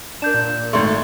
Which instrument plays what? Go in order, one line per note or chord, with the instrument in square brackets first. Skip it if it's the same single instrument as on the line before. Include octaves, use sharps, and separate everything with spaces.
[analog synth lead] D4 [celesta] A#4 G6 E7
[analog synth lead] A#2
[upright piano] G#1 A3 [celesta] C6